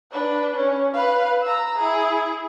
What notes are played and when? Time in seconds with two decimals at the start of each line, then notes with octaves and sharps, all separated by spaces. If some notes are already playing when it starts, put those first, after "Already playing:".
0.11 D4 B4
0.56 C#4
0.94 B4 F5
1.43 A#5 E6
1.78 E4 G#4